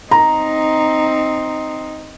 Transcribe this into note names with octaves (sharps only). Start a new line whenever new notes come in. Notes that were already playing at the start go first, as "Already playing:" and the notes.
C4 D#4 A#5